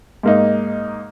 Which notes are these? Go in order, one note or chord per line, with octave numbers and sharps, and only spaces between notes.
G#2 A#3 D#4